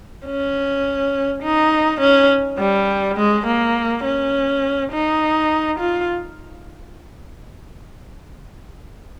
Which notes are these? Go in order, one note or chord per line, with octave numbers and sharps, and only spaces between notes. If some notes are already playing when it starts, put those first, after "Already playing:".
C#4
D#4
C#4
G3
G#3
A#3
C#4
D#4
F4